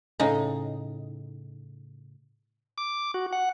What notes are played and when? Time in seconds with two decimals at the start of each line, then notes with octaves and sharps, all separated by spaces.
0.20 A2 C#3 D#4
2.78 D6
3.14 F#4
3.33 F#5